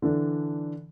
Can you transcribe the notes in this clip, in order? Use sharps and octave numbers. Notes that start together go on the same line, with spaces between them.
D3 E3 D4